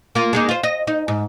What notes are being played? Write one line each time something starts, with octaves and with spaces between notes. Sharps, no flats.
A#3 F4
G#3 A#3 D#4
F4 C5
D#5
D#4
G#2